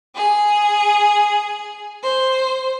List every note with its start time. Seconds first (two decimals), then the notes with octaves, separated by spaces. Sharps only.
0.15 G#4
2.03 C5